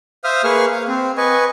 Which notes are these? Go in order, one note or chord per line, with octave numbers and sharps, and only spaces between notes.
C5 E5 F5 D#6 F6
A#3 G#4 B4 C#6 F6
F5
C4
B4 D#5 G#5 C#6